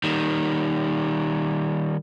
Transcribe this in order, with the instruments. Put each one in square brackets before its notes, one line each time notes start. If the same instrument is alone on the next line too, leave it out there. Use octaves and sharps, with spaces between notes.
[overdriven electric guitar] D#3 G3